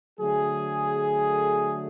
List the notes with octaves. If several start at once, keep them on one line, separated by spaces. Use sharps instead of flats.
D3 F#3 A3 G#4